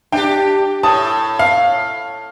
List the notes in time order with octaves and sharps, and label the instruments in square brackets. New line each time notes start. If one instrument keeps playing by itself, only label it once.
[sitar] D4 G4 [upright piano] G5
[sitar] A2 [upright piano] A5 D#6
[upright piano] F5